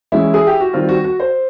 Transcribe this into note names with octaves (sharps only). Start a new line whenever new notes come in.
E3 G#3 C#4 E4
G#4
G4
F#4
D#3 G3 C4 F4
F#4
F#4
C5